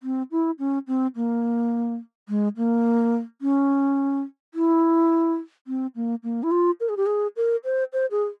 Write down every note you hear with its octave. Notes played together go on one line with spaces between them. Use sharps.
C4
E4
C#4
C4
A#3
G#3
A#3
C#4
E4
C4
A#3
A#3
E4
F4
A#4
G#4
G4
G#4
A#4
C5
C5
G#4